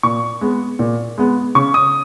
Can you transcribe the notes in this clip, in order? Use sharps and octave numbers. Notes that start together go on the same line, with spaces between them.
A#2 C#6
G#3 B3
A#2
G#3 B3
C#3 C#6
D#6